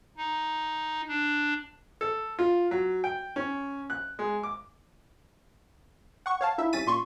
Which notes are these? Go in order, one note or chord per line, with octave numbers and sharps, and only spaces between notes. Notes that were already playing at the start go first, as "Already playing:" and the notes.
D#4
D4
A4
F4
F#3
G5
C#4
F#6
G#3
D6
F#5 C#6
C#5 F5 A5
D#4 E4 E5
C2 C#4 A6 B6 D#7
A#2 C6 C#6